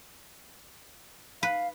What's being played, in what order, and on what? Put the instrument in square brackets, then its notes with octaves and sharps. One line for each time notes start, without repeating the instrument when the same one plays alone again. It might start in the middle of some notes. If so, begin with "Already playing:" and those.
[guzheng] B4 [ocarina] F5